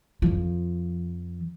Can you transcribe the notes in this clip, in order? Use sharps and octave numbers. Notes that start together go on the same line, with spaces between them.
F2 F3